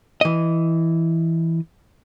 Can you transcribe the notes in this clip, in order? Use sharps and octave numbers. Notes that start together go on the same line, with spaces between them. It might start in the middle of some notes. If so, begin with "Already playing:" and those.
E3 D#5